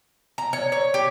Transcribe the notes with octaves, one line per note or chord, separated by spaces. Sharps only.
A#5
C#5
C#5
G4